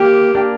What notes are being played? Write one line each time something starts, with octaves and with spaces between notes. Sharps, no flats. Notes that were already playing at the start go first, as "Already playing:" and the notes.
Already playing: A#3 G4
A#3 D4